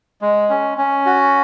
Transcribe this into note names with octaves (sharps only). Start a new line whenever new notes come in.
G#3
C#4
C#4
F#4